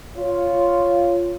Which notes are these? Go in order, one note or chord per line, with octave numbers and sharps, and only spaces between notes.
F4 C#5